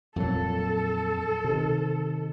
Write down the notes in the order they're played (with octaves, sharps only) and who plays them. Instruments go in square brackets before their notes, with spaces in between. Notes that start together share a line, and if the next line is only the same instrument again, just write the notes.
[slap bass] F2 A#2 F#3 [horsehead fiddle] A4
[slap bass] C3 D#3